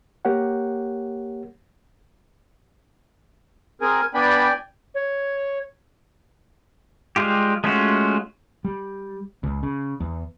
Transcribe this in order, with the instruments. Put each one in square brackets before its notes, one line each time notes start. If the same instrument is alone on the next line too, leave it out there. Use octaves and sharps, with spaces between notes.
[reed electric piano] A#3 G4 A#4 C#5 F#5
[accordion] C4 G#4 A#4 [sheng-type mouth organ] G#5
[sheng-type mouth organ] B3 D4 B5 [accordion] D5 G5 G#5
[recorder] C#5
[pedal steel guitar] G3 G#3 F4 G4
G#3 A3 C#4 F4 F#4
[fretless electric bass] G3
C#2
C#3
E2